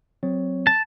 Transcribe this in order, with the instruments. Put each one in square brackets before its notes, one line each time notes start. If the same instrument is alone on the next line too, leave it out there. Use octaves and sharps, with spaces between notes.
[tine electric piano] F#3 C4 C#5
[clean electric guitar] A5